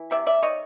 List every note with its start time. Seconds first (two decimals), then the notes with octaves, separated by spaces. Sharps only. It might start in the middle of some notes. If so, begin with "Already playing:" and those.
Already playing: E3
0.11 C3 D5 E5
0.27 D5 E5
0.42 D#3 C#5 D#5